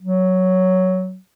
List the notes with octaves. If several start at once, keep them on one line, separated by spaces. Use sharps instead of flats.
F#3